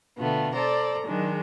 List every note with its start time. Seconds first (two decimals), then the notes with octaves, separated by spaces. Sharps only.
0.17 B2 D3 A3 B3 F4
0.53 A4 C5 D5 A#5
1.06 D#3 F#3 G#3 D4